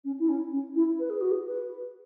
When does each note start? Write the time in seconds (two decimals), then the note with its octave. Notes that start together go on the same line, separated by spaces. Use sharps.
0.04 C#4
0.19 E4
0.29 C#4
0.52 C#4
0.75 E4
0.99 B4
1.09 G#4
1.21 F#4
1.31 G#4
1.46 B4